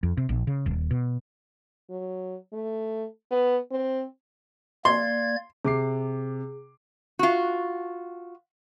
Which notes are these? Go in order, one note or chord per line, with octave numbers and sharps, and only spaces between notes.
F2
C3
A#1
C#3
D#1
B2
F#3
A3
B3
C4
A#3 D5 C6 G#6
C3 G#4 D6 C7
F4 F#4